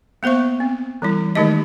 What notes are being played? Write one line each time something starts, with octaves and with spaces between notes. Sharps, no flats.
A#3 B3 C5 E5 C#6
C4
E3 G3 E4
D#3 G#3 A3 D#4 G4 D#5